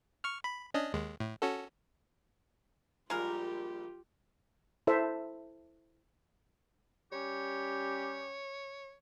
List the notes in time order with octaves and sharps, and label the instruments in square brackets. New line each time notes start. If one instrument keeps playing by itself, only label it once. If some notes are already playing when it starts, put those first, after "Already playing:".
[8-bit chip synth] C#6 F6
B5
C#4 D4 D#5
D#2 G#3
A2
C#4 F#4 A4
[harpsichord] A#1 A#2 G3 [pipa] G#3 A#4 [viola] F4 G4
[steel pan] E4 A4 C5 E5
[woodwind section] G3 C#4 G4 [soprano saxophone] C#5